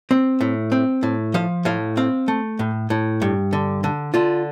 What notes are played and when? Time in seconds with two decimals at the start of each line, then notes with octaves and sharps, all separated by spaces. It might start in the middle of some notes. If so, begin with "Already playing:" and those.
0.11 C4
0.41 A2
0.72 C4
1.03 A2
1.34 F3 F5
1.65 A2 F5
1.97 C4 F5
2.28 A3
2.59 A2
2.90 A2
3.22 G2
3.53 D3
3.84 D3
4.14 D3 F4